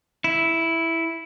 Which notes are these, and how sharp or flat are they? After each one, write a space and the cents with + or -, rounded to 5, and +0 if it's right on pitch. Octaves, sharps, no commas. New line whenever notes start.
E4 +0